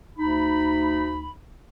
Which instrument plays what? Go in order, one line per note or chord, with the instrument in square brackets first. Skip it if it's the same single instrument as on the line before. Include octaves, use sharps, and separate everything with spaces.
[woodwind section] D2 D#4 B5